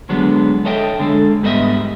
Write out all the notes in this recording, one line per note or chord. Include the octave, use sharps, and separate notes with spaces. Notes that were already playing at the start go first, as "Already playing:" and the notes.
D3 F#3 G#3 B3 D4
A4 C#5 D#5 E5 G5
D3 G#3 A4
G#2 G3 B3 F#4 D#5 E5